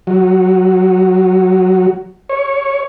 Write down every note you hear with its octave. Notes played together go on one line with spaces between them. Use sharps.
F#3
C#5